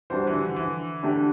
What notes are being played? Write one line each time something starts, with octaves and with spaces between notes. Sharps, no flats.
E3 G3 D4 F#4 C5
E3
D3
D3
E3
D3 A3 D4 G4